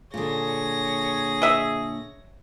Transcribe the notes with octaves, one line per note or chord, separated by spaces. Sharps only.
A#2 D3 G#4 C#5 A#6
D#5 E5